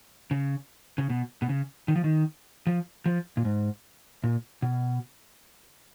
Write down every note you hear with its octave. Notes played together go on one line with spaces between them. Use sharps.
C#3
C#3
B2
B2
C#3
D#3
F3
D#3
F3
F3
A#2
G#2
A#2
B2